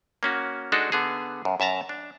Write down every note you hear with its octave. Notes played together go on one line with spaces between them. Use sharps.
A#3 C#4 F#4
G#3 D4 D#4 F#4 A4
D3 B3 G#4
F#2
F#2 E5 A5 A#5
D4